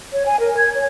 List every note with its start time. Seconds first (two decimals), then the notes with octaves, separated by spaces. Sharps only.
0.13 C#5
0.26 G#5
0.40 A#4
0.57 G#6
0.75 C#5